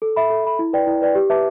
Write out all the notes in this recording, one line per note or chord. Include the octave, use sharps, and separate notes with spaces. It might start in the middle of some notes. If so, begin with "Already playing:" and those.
A4
E5 B5
A4
E5 B5
E4
B4 D5 G5
E4
B4 D5 G5
G4
B4 E5 A5 D6